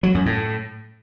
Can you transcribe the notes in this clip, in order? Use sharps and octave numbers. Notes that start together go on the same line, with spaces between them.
F#3
F#2
A2